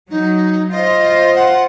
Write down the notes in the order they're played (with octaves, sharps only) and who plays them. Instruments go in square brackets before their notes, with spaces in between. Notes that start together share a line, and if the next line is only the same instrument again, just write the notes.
[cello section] F#3 [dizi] D#4
[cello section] F4 C5 [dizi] D#5
[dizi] F#5